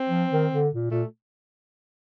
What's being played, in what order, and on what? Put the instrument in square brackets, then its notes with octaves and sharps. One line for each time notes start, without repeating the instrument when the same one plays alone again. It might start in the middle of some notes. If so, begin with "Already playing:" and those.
Already playing: [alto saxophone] C4
[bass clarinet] F3
D#3
D3
A#2
[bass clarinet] A#2 [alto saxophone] A3